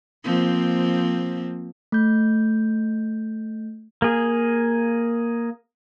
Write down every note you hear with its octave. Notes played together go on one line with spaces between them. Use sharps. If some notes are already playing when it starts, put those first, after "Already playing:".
F3 A#3 C4
A3 G6
A#3 G#4